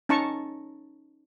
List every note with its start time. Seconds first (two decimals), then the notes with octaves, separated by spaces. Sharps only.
0.09 C#4 D#4 A5 A#5 C#6